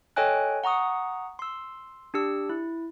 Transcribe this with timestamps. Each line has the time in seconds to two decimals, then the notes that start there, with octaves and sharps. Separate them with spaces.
0.16 A4 C#5 D#5 G5 G#5 F#6
0.64 F#5 A#5 C#6 D#6
1.39 C6 E6
2.14 D4 G4 E6
2.49 E4